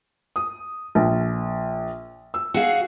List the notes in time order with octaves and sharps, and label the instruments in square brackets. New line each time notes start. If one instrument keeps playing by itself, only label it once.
[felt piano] D#6
A#1
E6
[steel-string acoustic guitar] F#4 G#4 F5